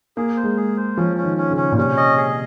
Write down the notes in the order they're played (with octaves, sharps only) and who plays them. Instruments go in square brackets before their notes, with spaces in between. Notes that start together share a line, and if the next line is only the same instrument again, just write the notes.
[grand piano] A#3 [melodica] G#4
[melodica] C5
[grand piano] G#3
[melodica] G#4
C5
[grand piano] F3 [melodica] C#4
[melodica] C#4
[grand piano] D#3
[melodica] C#4
[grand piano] C#3
[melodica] C#4
[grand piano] A#2
[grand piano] C3 [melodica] C#4
[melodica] D#5
G#4